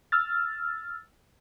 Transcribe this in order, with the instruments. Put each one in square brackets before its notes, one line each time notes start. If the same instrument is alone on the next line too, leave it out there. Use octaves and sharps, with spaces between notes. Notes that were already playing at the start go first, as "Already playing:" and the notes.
[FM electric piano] E6 F6 A6